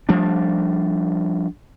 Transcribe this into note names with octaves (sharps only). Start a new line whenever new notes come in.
F3 G3 A3 D4